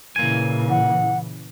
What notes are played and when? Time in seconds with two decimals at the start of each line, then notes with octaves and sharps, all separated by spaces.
0.16 A#2 C#3 E3 A#3 G#5
0.70 F#5